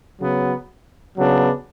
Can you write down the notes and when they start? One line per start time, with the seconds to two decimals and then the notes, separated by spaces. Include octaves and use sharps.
0.21 C#3 F#3 B3
1.18 C#3 F#3 B3 D4